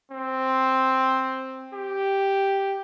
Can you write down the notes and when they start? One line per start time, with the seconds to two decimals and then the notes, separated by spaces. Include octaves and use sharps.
0.12 C4
1.73 G4